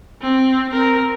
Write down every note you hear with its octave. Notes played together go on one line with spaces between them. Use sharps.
C4
C4 A#4